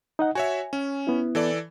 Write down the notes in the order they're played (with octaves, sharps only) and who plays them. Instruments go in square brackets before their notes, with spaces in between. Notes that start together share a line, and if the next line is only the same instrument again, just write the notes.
[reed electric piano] D#4 D#5 F#5
[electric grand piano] F#4 C#5 E5 [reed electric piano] G#5
[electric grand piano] C#4
[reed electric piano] B3 E4
[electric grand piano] E3 A4 D5